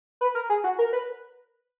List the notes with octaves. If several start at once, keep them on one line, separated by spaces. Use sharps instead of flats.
B4
A#4
G#4
F#4
A#4
B4